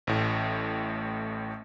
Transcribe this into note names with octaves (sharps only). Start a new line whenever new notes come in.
A1 A2